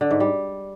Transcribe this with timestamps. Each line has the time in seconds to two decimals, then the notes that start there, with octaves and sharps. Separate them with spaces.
0.01 D3
0.11 G#2
0.20 G3